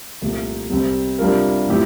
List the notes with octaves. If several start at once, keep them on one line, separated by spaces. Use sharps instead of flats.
C2 A#2 F3 A3
C2 C3 G3 C4
C3 G3 D4 F4 A#4
A2 F3 C4 E4 G4